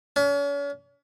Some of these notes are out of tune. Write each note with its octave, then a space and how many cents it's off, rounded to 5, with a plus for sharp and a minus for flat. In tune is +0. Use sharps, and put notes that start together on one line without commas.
C#4 +40